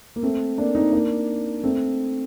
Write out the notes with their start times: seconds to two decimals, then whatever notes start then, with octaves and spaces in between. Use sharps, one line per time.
0.16 A#3
0.23 A3 C4
0.58 A#3 D4
0.75 C4 D#4
0.92 A#3 D4
1.63 A3 C4